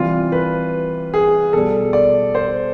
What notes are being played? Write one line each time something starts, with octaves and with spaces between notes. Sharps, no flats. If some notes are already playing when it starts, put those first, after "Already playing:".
Already playing: C3 E3 G3 F4
B4
G#4
B2 G3 A4
D5
C5